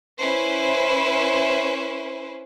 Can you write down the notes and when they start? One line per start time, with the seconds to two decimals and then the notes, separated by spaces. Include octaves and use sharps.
0.20 C#4 E4 B4 C5